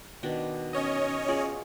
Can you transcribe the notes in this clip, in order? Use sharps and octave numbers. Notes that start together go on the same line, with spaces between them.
B2 D#3 D4
C#4 C#5 D#5
F4 G#4 D5